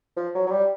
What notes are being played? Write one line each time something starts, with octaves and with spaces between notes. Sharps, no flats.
F3
F#3
F#3
G3